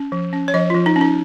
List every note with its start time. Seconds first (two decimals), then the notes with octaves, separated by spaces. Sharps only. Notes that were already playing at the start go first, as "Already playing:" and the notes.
Already playing: C#4
0.12 F3
0.33 C#4
0.48 C#5
0.54 F3 D#5
0.70 F4
0.75 F3
0.86 D#4
0.96 C#4
1.01 D#4